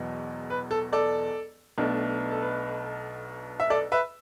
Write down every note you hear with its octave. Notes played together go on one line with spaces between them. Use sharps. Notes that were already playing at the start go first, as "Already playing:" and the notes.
Already playing: E1 E2 B2 F#3
B4
A4
A4 D5
B1 B2 A3 D4
A4
B4
E5
A4 D5
B4 E5